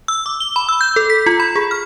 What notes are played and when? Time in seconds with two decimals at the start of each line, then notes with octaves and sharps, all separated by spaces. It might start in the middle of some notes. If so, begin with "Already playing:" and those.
0.08 E6
0.26 D6
0.40 G7
0.56 B5
0.69 E6
0.81 G6
0.96 A4
1.10 B6
1.26 F4
1.40 B5
1.56 G#4
1.71 F6